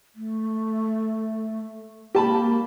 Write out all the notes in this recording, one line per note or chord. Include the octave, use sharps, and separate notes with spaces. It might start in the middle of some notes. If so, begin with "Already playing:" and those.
A3
A#3 G4 A5 B5